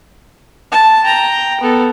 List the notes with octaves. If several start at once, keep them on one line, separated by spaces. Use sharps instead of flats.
A5
G5 A#5
B3 A4